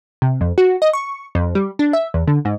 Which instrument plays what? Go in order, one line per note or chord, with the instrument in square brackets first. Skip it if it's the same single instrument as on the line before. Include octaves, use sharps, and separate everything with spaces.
[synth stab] C3
F2
F#4
D#5
C#6
F2
G3
D4
E5
E2
D3
G#2